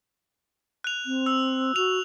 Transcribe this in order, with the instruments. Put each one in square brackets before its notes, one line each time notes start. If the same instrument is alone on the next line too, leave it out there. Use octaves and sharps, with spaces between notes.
[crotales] F#6 F7
[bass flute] C4
[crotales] E6
[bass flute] F#4 [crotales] F7